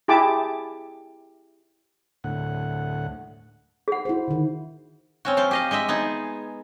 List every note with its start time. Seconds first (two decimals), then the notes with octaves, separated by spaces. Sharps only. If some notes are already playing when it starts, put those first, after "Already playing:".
0.08 E4 G4 G#4 A5 D6
2.24 D2 A2 F#5
3.88 G#4 F#5
4.05 E4 F#4 C5
4.28 D3 D#3
5.25 C4 C#4 F#4
5.37 F3 C5 F5
5.51 G4 D#5 F5
5.71 G#3 C5 D#5 E5
5.89 B3 D#4 G#4